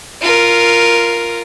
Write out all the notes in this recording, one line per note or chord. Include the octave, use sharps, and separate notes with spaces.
F4 A#4